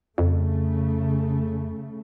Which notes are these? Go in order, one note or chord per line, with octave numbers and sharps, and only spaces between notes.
F2 C#3 A3